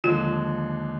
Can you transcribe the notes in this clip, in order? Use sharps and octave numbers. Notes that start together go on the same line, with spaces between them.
D#2 D3 F3 G#3 F4